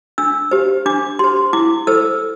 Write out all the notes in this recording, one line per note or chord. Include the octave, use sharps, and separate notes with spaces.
D4 E6
G4 C5
D4 D6
G4 C5 C6
E4 D6
A4 C5 E6